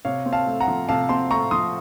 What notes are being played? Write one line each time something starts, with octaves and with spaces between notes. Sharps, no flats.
C3 C#5 F5
C4
F5 A5
A3
F#5 A#5
F3
C3 F5 A5
C4 A5 C6
A3 A#5 C#6
F3 C6 D#6